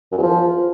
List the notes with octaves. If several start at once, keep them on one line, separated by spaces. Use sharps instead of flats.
F#2
E2
F3